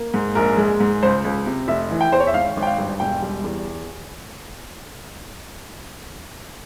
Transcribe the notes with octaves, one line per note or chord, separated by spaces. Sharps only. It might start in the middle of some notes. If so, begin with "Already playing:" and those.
Already playing: A#3
G#2
A#1 A#4
G#3
G#2
C#2 C5
C#2
C3
F1 E5
E3
G5
E2 C5
C#5
E5
G#1 F5
G#1
G5
F5
G2
E1 G5
G3
E2